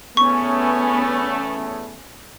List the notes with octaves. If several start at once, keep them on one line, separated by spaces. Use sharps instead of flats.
E2 A3 B3 C#4 C#6